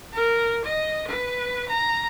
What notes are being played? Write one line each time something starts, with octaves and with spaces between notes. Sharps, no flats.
A#4
D#5
B4
A#5